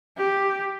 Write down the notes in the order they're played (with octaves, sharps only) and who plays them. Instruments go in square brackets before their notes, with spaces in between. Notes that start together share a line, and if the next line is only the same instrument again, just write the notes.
[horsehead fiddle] G4